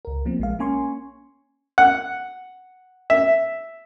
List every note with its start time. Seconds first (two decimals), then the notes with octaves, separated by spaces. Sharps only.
0.05 C#2 A#4
0.25 F3 A#3 C4
0.39 A#1 G#3 F5
0.59 A#3 C#4 G#5 C6 C#6
1.78 F#5
3.10 E5